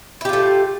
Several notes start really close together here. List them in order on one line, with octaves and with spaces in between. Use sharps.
E4 G4 F4 A3